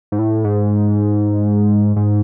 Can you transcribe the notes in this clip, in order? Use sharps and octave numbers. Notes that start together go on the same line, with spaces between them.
G#2
A2
G#2
G#2